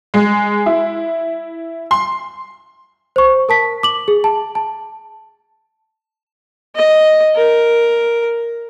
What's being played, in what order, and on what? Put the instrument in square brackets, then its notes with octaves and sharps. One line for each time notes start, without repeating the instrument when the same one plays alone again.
[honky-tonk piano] G#3
E4
C6
[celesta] C5 C#6
A#4 A5 B6
D6 F#7
G#4
A5
A5
[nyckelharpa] D#5
A#4